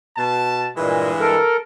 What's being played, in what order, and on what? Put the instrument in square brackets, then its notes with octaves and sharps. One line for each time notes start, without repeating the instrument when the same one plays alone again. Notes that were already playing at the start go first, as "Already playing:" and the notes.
[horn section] B2 A5
[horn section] G2 E3 G#3 [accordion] A#2
[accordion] A4 A#4